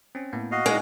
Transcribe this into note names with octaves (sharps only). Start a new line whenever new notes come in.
C4 C#4
A2 A#3 B3
F#4 D#5 F5
G#3 D#4 E4 D5